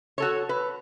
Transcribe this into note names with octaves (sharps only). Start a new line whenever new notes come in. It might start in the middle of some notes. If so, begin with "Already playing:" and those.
F#4 A4 C#5
B4